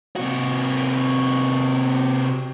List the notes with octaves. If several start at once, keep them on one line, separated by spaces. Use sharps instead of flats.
C3 F#4